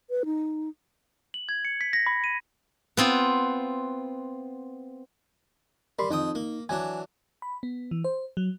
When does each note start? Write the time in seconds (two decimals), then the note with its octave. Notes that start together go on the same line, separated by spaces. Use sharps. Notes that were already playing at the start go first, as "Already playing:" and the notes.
0.10 B4
0.25 D#4
1.34 F#7
1.49 G#6
1.65 C#7
1.81 B6
1.93 A#6
2.07 B5
2.24 D#7
2.97 B3 C4 F4
5.99 G3 A#4 B5 C6
6.11 F2 D#4 G5 D#6
6.35 A#3
6.69 E3 F#3 D4 G#5
7.42 B5
7.63 B3
7.91 E3
8.04 C5
8.37 F#3